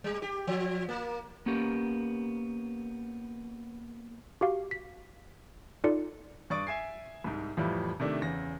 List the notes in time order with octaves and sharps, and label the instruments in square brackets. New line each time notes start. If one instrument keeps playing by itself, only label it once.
[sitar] G3
G4
F3
A#3
[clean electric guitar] A#3 B3 C#4 G4 A#4
[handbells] F#4 G4 F5
B6
D#4 F4 A4 D5 C#7
[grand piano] G2 D5 C#6 D#6 A6 D7
E5 G#5 G#6 C7
C2 G#2
F2 A2 E3 F3 G3
C3 D#3 A3 D4
E2 C#3 A#6